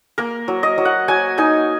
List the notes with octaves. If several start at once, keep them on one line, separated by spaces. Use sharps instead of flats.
A#3 A#4
F#3
D#5
F#3
F#5
F#3 G#5
D#4 G#5